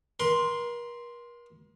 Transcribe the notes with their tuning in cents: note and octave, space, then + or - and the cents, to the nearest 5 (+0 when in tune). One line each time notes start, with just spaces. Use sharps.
A#4 +40 C6 +0